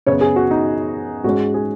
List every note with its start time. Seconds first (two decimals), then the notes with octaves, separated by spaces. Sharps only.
0.07 F#2 C#3 B3 C#5
0.21 G#4
0.36 F#4
0.51 D#4
1.24 G#2 G#3 C#4 F#4
1.54 G#4